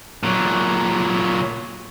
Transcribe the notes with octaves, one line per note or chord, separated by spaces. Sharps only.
A#2 F#3